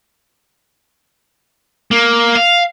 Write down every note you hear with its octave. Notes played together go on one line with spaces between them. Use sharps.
A#3
F5